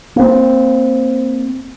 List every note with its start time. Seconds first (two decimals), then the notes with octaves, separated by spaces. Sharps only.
0.16 A#3 C4